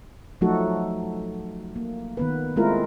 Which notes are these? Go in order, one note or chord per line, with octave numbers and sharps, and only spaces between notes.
F3 F#3 A3 D#4 F#4 A4
A#3
D#3 B3 B4
G#3 A3 C4 E4 F4 A#4